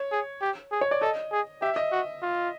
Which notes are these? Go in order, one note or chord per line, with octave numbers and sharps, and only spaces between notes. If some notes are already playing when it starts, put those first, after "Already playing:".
Already playing: C#5
G#4
G4
G#4
C#5
D5
A4 D#5
G#4
G4 E5
D#5
F#4
F4